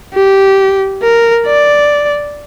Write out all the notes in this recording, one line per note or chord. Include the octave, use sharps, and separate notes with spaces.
G4
A#4
D5